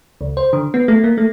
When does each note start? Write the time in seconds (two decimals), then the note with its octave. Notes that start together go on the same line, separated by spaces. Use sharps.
0.21 C#2
0.37 C5
0.53 D3
0.74 B3
0.88 A3
1.04 A#3
1.18 A3